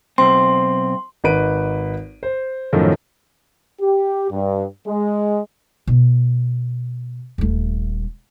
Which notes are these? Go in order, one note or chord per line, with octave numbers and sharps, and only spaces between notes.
B1 C4 C6
G#1 D#4 B4 D7 D#7
C5
F#2 A2 D#3 F3 A3
G4
G2
G#3
B2
D#1 A3